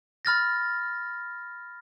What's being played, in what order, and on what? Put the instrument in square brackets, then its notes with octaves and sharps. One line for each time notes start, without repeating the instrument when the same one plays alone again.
[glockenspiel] B5 F6 A6 A#6